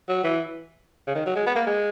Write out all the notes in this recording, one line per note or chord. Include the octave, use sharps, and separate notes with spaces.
F#3
E3
C#3
D#3
F#3
G#3
B3
A#3
G#3